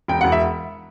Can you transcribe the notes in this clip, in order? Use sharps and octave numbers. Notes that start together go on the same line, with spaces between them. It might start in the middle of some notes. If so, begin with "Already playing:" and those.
E1 G5
F#5
E1
E5